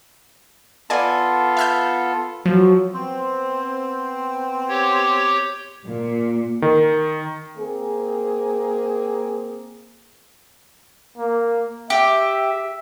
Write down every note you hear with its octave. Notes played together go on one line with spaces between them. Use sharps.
B3 F4 A4 D5 G#5
E5 F6 G6
F3 F#3
B3 C4
G4 C#5
A#2
D#3
A#3 C4 G#4
A#3
G4 E5